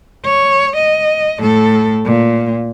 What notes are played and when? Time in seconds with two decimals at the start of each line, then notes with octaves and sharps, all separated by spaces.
0.25 C#5
0.76 D#5
1.39 A2 A4
2.06 A#2